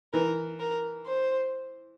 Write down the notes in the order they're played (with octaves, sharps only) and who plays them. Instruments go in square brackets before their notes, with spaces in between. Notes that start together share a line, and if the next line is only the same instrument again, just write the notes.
[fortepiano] E3 [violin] A#4
[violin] A#4
C5